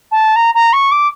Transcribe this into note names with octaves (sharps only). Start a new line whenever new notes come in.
A5
A#5
A#5
C#6
D6